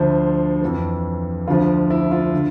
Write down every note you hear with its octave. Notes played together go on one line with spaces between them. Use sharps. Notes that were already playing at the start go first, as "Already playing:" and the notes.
Already playing: D2 D3 F3 C5
F2 E3
D2 D3 F3 F4
E4
F4
D3